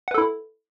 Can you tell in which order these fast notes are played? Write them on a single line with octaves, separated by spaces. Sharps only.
F#5 B4 A4 E4